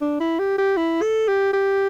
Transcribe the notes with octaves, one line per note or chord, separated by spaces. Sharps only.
D4
E4
G4
G4
E4
A4
G4
G4